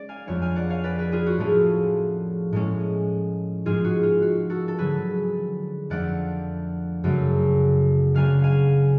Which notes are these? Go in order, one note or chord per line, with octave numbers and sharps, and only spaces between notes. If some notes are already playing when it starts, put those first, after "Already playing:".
Already playing: G#3 C#4 D5
F5 G#5
F2 F3 G#3 B3 D4 C#5 F5
F5 G#5
D5 F#5
C#5 F5
B4 D5
G#4 B4
F4 G#4
F#4
A2 F3 A3 C#4 F4 G#4
A2 G#3 C#4
G#2 F3 G#3 F4 G#4
F#4
F4
F#4
F#4 A4
A4
D3 F#3 C#4 G#4 B4
F2 F3 A3 D4 D5 F#5
F#2 C#3 F#3 A3
C#3 F#3 B3 D4 F5 G#5
F5 G#5